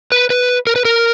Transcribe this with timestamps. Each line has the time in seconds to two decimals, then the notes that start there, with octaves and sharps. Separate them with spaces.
0.12 B4
0.30 B4
0.67 A#4
0.76 B4
0.85 A#4